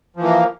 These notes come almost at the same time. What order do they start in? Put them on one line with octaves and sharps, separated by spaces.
F3 E3 A#3